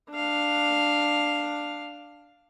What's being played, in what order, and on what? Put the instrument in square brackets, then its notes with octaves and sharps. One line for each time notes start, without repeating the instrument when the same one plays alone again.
[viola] D4 F5